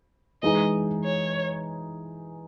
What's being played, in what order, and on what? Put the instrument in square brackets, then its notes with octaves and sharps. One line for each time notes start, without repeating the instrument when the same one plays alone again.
[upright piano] E3 G#3 D#4 G#4 [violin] D#5
[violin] C#5